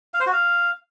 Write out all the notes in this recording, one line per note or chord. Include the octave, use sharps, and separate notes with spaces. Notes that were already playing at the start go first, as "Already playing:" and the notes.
F5
C5
F#4
F5